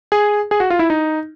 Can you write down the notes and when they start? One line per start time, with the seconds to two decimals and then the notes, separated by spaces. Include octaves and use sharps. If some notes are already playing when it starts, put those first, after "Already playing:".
0.12 G#4
0.51 G#4
0.60 F#4
0.70 F4
0.79 E4
0.90 D#4